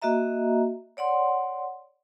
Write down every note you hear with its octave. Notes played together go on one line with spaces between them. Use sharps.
A#3 F#4 D#5 E5 A#5
C#5 D5 F#5 C6